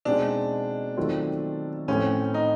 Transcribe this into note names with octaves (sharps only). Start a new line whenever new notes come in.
B2 G#3 C4 D4 D#4 F#4
D#3 F#3 A3 C4 F4
A2 F3 A3 C4 C#4
D#4